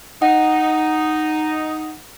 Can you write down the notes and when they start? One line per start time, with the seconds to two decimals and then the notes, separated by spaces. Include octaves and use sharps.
0.22 D#4 F#5